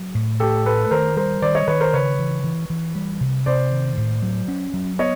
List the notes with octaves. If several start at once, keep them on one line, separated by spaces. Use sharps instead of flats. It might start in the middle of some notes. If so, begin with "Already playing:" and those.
Already playing: F#3
A2
A2 G4 A4
A3 A4 B4
B4
D#3 A#4 C5
G3 A#4 C5
D#3 C5 D5
C#5 D#5
D#3 B4 C#5
A#4 C5
C#3 B4 C#5
E3
E3
E3
G3
C3
C3 C5 D5
D#3
A2
F#3
C#4
F#3
B3 C#5 D#5